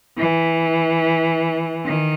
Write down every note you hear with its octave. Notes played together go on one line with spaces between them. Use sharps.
E3
D#3